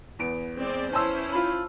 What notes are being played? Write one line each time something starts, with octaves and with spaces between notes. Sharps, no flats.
E2 B3 D7
G#3 C4 D5
C#4 E4 C5 A5 C6 E6
F4 B5